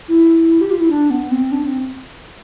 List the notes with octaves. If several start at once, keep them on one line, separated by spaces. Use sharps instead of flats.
E4
G4
F4
E4
D4
B3
C4
D4
C4